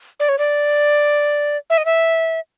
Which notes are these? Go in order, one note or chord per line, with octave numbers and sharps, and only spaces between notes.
D5
C#5
D5
E5
D#5
E5